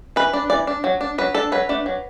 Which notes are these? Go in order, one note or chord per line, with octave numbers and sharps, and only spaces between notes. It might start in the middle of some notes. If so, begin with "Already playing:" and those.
E3 B4
D4
E3 D5
D4
F#3
D4
F#3 B4
D4 A4
F#3 B4
A3 D4
F#3